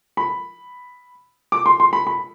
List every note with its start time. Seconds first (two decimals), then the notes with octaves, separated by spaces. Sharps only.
0.17 B5
1.52 D6
1.66 C6
1.80 C6
1.93 B5
2.07 B5